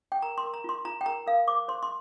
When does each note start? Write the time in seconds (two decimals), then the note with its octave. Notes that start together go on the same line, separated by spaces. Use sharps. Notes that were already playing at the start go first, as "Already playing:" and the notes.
0.12 G5
0.22 A#4 A#5
0.38 C6
0.44 A#4
0.54 A#5
0.64 F4 C6
0.85 F4 A#5
1.01 G5
1.06 A#4 A#5
1.27 A#4 F5
1.48 C5 D6
1.68 C5 C6
1.83 C6